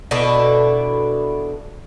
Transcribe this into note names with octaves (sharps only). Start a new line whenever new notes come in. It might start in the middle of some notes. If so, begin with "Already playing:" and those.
B2 D4 E4 A4